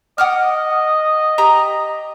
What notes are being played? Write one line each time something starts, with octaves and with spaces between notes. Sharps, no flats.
D#5 F#5 D6 F6
G4 A#5